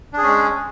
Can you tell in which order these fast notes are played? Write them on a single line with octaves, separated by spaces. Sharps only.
D4 G#4 C#4 G#3